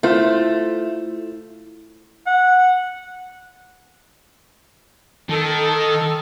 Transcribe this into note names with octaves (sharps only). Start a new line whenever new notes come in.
A3 E4 F4 C5
F#5
D#3 A4